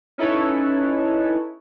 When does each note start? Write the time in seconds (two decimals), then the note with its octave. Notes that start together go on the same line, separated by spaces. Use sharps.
0.18 C#4 D#4 E4 A4 B4 C#5